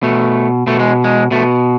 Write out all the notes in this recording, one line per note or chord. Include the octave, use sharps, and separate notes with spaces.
B2 A3
B2 A3
G#3
G#3
B2 A3